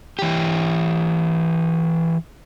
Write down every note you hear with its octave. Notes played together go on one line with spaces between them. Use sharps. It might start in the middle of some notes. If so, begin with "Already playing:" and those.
E3 G4